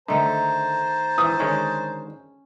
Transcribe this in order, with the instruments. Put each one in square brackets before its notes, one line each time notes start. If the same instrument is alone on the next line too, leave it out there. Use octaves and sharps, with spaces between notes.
[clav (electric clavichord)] D3 [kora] D#3 A3 D#4 [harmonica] C5 A5 A#5
[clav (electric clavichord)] E3 [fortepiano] D#6
[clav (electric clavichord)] D3 D#3 G#3 [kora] C#4